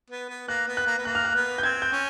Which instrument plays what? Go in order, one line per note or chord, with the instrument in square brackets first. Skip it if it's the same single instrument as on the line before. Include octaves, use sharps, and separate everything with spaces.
[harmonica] B3
B3
[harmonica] A#3 [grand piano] F#6
[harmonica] B3
[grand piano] F#6
[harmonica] A#3
B3
[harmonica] A#3 [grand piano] F#6
[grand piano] F6
F#6
[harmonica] B3
[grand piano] G6
[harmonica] C4 [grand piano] G#6
[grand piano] G6
[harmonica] C#4